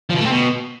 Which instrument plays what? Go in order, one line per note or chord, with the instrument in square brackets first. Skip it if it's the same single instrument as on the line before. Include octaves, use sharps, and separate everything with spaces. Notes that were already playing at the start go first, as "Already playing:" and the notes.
[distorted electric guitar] F3
B2
A3
C4
B2